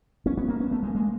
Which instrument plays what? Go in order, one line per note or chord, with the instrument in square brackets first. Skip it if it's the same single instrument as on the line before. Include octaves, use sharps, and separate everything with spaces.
[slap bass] B3 C#4
B3 C#4
A#3 C4
B3 C#4
A3 B3
G#3 A#3
G#3 A#3